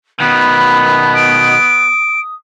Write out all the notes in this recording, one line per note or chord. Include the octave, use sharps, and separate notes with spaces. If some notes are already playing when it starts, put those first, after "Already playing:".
B2 D#3 B3 B5
D#6 D7